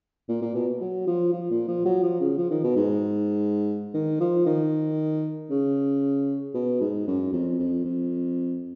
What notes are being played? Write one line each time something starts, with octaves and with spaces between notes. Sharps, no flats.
A#2
A#2
B2
F#3
F3
F3
A#2
F3
F#3
F3
C#3
F3
D#3
B2
G#2
D#3
F3
D#3
C#3
B2
G#2
F#2
F2
F2
F2